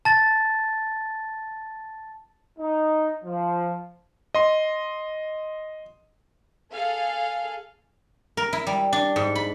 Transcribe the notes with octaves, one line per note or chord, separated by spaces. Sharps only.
A5 A6
D#4
F3
D#5 C6
G#4 A4 F5
A#4
E4
G3
D4
G#2
B5